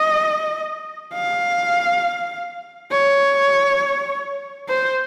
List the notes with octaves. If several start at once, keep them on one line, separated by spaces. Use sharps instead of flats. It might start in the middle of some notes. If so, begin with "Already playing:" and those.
Already playing: D#5
F5
C#5
C5